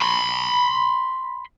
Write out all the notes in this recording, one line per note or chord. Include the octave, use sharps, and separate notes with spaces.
B5 C6